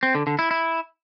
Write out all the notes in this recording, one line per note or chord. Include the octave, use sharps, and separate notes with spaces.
C4
D3
D3
E4
E4